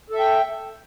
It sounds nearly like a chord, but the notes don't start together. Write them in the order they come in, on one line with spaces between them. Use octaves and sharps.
A4 E5 G5